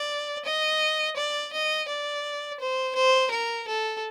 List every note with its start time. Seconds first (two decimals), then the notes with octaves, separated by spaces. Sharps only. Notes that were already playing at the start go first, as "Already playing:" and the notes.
Already playing: D5
0.45 D#5
1.16 D5
1.53 D#5
1.88 D5
2.60 C5
2.95 C5
3.31 A#4
3.68 A4